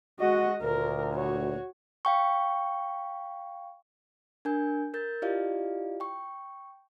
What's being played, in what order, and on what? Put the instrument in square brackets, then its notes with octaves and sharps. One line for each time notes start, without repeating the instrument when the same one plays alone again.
[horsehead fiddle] G#3 D#5 [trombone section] F#4
[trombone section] D2 A#2 [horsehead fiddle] A#4
[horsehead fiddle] F#4 C#5
[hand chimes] F5 G5 C#6
D4 A#4 G#5 G6
A#4 G6 A6
E4 F4 G4 D5 D#5 F5
G5 C#6